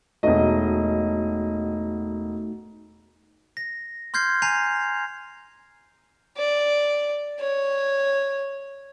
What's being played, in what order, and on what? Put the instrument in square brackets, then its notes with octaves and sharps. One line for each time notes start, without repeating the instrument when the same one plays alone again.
[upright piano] E1 D#5 [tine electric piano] A3 D#4 F#4
[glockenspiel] A#6
C6 F6 G6 G#6 C7
G#5 A#5 G6 C7 F7
[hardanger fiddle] D5
C#5